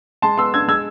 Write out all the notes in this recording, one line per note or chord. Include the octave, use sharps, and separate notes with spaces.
G#3 A5 C6
B3 C6 E6
D4 E6 G#6
G#3 E6 G#6